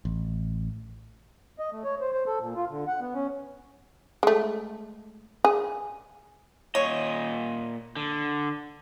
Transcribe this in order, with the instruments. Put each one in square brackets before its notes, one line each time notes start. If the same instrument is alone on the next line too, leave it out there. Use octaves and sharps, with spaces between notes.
[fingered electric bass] A1
[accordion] D#5
A3
C#5
C5
C5
A4
A#2
F4
D3
F#5
B3
C#4
[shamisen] G#3 A3
G#4
[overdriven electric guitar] A#2 D#5 [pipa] C#5
[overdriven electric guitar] D3